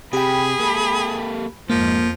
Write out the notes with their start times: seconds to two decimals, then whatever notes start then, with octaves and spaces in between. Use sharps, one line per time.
0.13 C3 G4 G#4 G5 B5
0.60 A#3 A4
1.70 F2 G#2 F3 A#3